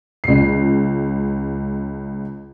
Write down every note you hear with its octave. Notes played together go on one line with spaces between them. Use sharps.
C#2 C7